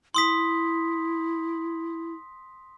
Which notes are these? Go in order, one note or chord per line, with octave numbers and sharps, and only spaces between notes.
E4 C6 D#6 B6